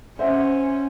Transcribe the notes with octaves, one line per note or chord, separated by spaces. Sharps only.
C#4 C5 E5 F#5